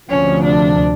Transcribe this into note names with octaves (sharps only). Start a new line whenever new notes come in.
D2 C3 F3 C#4
D4